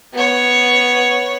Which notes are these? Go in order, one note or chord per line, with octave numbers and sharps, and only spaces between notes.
B3 C#5